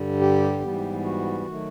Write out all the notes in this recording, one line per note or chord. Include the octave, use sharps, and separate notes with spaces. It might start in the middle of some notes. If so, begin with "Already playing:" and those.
Already playing: G2 D3 G3
G4
G#2 E3 G3 B3
F#4
D#3 F#3 A3